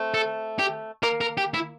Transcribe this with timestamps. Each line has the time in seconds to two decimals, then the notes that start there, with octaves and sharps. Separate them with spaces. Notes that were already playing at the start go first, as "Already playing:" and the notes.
Already playing: A3 C4
0.14 A4
0.59 G4
1.03 A#3 A#4
1.21 A#4
1.37 G4
1.54 E4